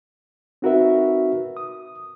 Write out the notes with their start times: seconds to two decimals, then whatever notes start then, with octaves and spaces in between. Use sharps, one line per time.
0.62 C4 D#4 F#4 A#4 B4 E5
1.57 D#6